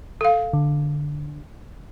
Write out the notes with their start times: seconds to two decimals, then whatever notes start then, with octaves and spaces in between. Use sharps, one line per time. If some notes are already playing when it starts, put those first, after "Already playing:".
0.21 A4 F5
0.53 D3